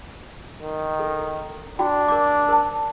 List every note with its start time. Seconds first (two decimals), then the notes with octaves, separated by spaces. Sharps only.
0.62 D#3
0.99 A4
1.79 D4 F#4 G5 B5
2.08 A#4 D5 D6
2.49 A#4 C5 A5